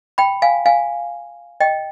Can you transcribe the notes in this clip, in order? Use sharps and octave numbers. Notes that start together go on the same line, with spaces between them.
G5 B5
F5 G#5
F5 G#5
D#5 G5